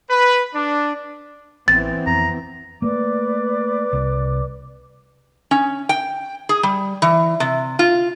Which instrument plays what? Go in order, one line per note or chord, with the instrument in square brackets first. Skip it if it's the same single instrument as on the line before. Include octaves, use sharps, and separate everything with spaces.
[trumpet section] B4
D4
[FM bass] A1 [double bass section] E3 B3 C4 [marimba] A6
[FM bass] F2 [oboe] A#5
[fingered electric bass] A3 A#3 [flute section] B4 D5 D6
[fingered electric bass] C2
[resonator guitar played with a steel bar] C#4
G5
G#4
G3
E3
C3
F4